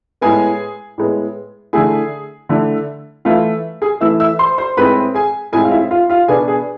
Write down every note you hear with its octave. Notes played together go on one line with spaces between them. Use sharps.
A2 G#3 B3 G#4 G#5
A2 G#3 B3
D3 A3 E4 G#4 G#5
D3 A3 E4
E3 A3 E4 F4 F5
G#4 G#5
E3 A3 E4 E5 E6
E5 E6
C5 C6
C5 C6
A2 G#3 C4 E4 B4 B5
G#4 G#5
A2 G#3 C4 E4 G#4 G#5
F5
E4 E5
F4 F5
F4 F5
B2 B3 D4 G#4 G#5
G#4 G#5